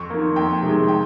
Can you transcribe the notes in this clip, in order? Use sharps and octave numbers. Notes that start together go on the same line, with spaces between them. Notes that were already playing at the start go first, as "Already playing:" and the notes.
Already playing: F2 C#6
D#3 A#3
F2 G5
C3 D#3 G#3
G5